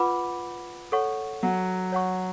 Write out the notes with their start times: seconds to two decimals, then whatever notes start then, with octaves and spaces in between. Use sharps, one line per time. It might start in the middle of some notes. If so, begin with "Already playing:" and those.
Already playing: F4 B4 F#5 B5 D6
0.92 A4 C#5 F#5 C#6
1.43 F#3
1.92 C#5 F#5 C#6